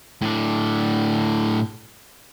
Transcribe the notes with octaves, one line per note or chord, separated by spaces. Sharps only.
A2 D4